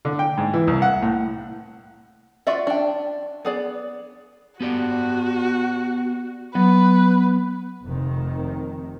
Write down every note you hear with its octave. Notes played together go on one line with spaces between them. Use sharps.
D3
G5
G#2
E3
C2
F#5
A2
F4 F#4 D5 E5
D4 G5
B3 G#4 D5
B3 F#4 G4 D5
F#3 B3 B4
F1 C3 D#3